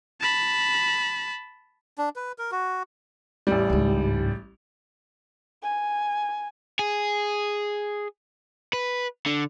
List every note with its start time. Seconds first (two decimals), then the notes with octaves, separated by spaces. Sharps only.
0.20 A5 B5
1.98 D4
2.16 B4
2.38 A#4
2.52 F#4
3.47 A1 G3
3.70 C#2 G#2
5.63 G#5
6.79 G#4
8.73 B4
9.26 D3